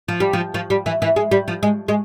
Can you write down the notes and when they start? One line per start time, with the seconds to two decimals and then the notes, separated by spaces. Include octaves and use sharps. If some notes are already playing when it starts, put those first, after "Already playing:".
0.08 F3
0.20 G3
0.33 F3
0.54 F3
0.70 G3
0.86 E3
1.02 E3
1.16 G#3
1.31 G3
1.48 F3
1.63 G#3
1.88 G#3